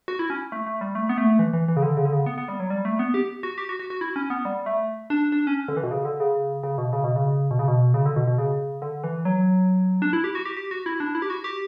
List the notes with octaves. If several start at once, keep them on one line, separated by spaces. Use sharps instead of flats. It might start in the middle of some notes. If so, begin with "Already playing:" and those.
F#4
E4
C#4
A3
A3
G3
A3
B3
A3
E3
E3
E3
C#3
D3
C#3
D3
C#3
B3
B3
G3
F#3
G3
A3
B3
G4
F#4
G4
F#4
F#4
F#4
E4
C#4
B3
G3
A3
D4
D4
C#4
D3
E3
B2
C#3
D3
C#3
C#3
B2
C#3
B2
C#3
B2
C#3
B2
C#3
D3
B2
B2
C#3
D3
E3
F#3
D4
E4
G4
F#4
G4
G4
F#4
E4
D4
E4
G4
F#4
G4